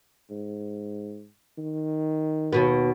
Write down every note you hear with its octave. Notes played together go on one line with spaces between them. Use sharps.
G#2
D#3
D#2 B2 B3